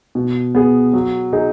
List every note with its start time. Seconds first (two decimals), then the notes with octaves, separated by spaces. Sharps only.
0.15 B2
0.55 B3 G#4
0.93 F#3
1.33 D#4 G#4